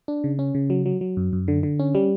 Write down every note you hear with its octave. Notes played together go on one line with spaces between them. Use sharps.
D4
C#3
C#4
C#3
F#3
F#3
F#3
F#2
F#2
D3
D3
C#4
G3